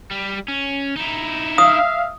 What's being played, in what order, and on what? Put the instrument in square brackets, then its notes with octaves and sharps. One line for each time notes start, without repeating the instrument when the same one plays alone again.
[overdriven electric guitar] G3
C#4
D#4 E4
[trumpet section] E5 F5 [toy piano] D#6